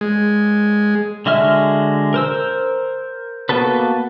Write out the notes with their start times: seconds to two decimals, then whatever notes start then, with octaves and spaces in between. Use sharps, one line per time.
0.01 G#3
1.26 D3 G#3 F#4 E5 F6
2.14 A#4 C5 E6
3.49 A#3 B3 F#4 A4 B4